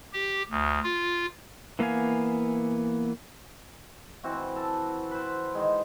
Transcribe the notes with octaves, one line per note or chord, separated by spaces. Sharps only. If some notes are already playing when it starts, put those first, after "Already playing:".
G4
D2
F4
E3 A#3 B3 F5 G#5
E3 C4 F#4
A4
B4 C5
D#3 G#3